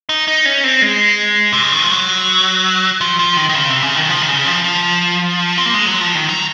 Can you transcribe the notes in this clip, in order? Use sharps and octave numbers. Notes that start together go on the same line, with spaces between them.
D#4
D#4
C#4
C4
G#3
C3
C#3
D#3
F3
F#3
F3
F3
D#3
D#3
C#3
C3
C#3
D#3
F3
D#3
C#3
F3
F3
C4
A#3
G#3
F#3
F3
D#3
F#3